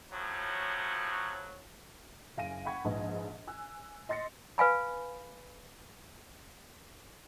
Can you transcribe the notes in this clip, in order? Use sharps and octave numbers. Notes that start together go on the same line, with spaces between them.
A2 F3 F#3
F#1 F5 G#5 A#6 D7 D#7
F#5 G5 B5 C#6 G#6
A#1 G#2 G#3 B4 D#5
G#5 E6 F#6
D#5 C6 A6 A#6 C#7
B4 F5 G#5 B5